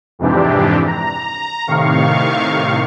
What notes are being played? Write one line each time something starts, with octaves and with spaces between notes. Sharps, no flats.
F2 G#2 C3 E3 D4 G4
A#5
A2 C3 D#3 F5 C#6